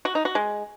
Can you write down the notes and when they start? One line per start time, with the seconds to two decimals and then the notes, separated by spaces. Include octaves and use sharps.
0.05 F#4
0.15 D#4
0.25 F#4
0.35 G#3